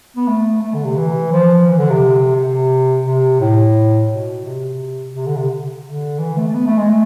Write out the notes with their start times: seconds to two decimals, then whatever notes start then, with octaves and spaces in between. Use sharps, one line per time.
0.17 B3
0.27 A3
0.62 A3
0.74 D3
0.85 C3
0.97 E3
1.32 F3
1.67 E3
1.78 D3
1.90 C3
2.36 C3
3.05 C3
3.40 A2
4.10 B2
4.45 C3
5.15 C3
5.26 D3
5.36 C3
5.85 D3
6.19 E3
6.37 A3
6.48 A3
6.54 B3
6.67 A3
6.78 G#3
6.89 A3